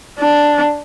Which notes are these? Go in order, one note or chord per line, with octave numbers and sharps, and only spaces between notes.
D4